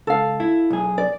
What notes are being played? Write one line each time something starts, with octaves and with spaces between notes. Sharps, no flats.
C#2 A4 F5
E4
B1 G#4
D5